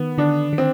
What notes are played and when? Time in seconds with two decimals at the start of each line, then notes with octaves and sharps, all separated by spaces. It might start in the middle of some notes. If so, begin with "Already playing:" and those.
Already playing: D#3 B3
0.18 D3 D4
0.53 D#3
0.58 C4